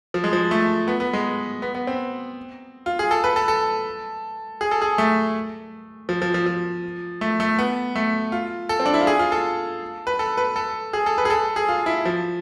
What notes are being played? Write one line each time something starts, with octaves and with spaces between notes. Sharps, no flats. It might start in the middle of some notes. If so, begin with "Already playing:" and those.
F3
G#3
F3
A3
B3
B3
G#3
B3
B3
C4
F4
G#4
A4
B4
A4
A4
G#4
A4
G#4
A3
F3
F3
F3
F3
A3
A3
B3
A3
F4
A4
C4
D4
E4
F4
G#4
F4
A4
B4
A4
B4
A4
G#4
A4
B4
G#4
A4
G#4
F4
E4
F3